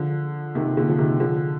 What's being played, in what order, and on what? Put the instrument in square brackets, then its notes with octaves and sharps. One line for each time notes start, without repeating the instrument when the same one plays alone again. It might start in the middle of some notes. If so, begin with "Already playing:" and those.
Already playing: [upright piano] D3 F3
C3 D#3
A#2 D3
F3
C3 D#3
D3 F3